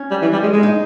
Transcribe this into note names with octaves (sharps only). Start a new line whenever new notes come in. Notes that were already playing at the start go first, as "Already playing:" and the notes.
Already playing: C#4
G3
E3
G3
G#3
G#3
D#4